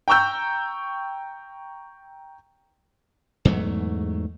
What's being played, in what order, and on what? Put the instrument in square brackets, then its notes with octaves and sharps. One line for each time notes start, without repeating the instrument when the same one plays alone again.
[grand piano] G5 A#5 C#6 E6 G6
[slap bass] E2 G#2 F#3 A3